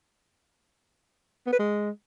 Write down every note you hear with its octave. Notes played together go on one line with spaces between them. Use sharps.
B3
B4
G#3